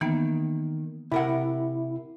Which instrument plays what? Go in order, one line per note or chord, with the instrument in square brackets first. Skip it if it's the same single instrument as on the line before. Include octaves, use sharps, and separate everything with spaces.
[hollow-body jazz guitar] D#3 [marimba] E3 A#3 B3
[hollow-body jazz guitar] C3 A#4 F#5 [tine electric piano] E4